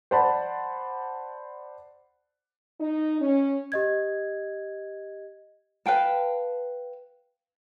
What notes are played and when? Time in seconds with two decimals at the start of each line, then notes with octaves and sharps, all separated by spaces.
0.11 C5 D5 F#5 A5 B5
2.79 D#4
3.20 C#4
3.72 G4 D#5 G#6
5.86 B4 F5 G5 A5